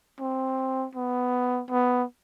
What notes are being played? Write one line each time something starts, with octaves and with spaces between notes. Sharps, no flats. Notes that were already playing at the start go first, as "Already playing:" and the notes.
C4
B3
B3